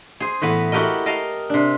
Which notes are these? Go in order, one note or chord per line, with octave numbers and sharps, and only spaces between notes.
G#4 C5
A2 E3 B3
E4 F#4 G4 A4 A#4 D#5
A#4 D#5 F5 A5
C3 D4